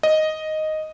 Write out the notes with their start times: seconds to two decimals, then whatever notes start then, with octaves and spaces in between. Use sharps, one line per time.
0.03 D#5